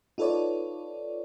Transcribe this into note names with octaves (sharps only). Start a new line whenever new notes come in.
D#4 F4 A4 B4 C#5 D5